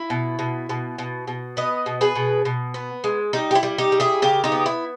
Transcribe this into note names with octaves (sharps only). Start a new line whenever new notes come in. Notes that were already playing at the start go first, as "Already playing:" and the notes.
Already playing: E4
B2
B2
B2
B2
B2
B3 B4 D#5
B2
G#4 B4
B2
B2
B3
G#3
G3 D#4
G4
E4
G3
D#4 G4
G3
E4 G#4
C#3 G4 A#4
D#4 G4
B3
E4